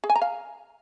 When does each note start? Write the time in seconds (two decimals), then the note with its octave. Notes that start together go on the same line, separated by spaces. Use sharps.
0.04 G#4
0.10 G#5
0.16 A#5
0.22 F5